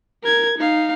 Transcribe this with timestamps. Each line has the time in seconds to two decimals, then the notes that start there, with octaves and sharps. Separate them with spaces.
0.24 A#4 G#6
0.58 D#4 F5